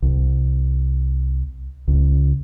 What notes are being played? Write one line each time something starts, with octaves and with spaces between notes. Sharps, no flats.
C2
C#2